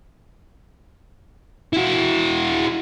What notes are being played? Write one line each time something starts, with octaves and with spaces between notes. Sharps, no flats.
E4 F#4